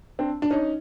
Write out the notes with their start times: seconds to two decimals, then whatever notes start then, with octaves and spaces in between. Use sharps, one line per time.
0.19 C4 D4
0.42 D4
0.50 C#4 D#4